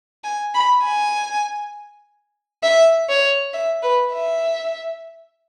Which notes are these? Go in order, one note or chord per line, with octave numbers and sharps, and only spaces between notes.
G#5
B5
G#5
E5
C#5
E5
B4
E5